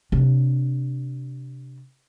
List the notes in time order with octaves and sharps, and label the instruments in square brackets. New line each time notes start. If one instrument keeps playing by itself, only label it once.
[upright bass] C3 D4